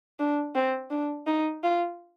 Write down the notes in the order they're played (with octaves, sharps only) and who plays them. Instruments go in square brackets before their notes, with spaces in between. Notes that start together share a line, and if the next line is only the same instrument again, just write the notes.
[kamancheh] D4
C4
D4
D#4
F4